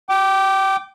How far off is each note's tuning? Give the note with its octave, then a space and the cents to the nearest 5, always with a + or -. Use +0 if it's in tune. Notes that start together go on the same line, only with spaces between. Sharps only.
G5 -25 D6 +0